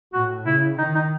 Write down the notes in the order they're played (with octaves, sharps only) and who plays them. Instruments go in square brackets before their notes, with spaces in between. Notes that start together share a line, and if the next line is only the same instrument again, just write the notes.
[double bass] A2 [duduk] F#4
[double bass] C#3 [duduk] E4
[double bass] D#3 [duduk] D#4
[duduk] D#4